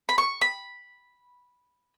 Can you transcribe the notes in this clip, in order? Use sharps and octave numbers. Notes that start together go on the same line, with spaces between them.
B5
C#6
B5